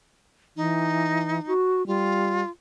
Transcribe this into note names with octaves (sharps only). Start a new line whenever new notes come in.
E3 D#4
F#4
G3 F4